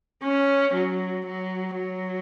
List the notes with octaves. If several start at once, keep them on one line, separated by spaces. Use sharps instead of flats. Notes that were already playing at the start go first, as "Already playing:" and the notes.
C#4
F#3
F#3
F#3